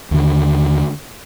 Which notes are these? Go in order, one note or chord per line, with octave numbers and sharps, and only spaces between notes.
D#2 D3